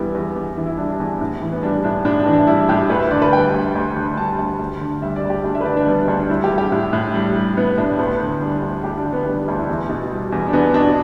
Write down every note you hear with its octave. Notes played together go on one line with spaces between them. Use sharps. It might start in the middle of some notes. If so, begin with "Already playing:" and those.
Already playing: E2 E3 G3 B3 E4
E2
E2
E3
E4
G3 D4
D4
E2
A2
E3
B3
G3 D4
A2 D4
A2 D4
D4
E3
D4
G3 E4
A2 G4
D2 B4
E5
D3 D5
B4
G3 G5
D2
D2
D3
G3 A5
D2
D2
D3
G3 E5
D5
D2
G4
D2 D4
E5
B4
D3 D5
D4
G3 B3
D2 D4
D4
G3 E4
G4
G3
G4
A2 E4
A2
G3
G3
A2 B3
A2 D4
D2 B3
D3
G3 D4
D2
D2 G4
D4
D3
B3
G3 D4
D4
D2 D4
E4
E2
B2
G3
E2
D4
E2 B3
B2 D4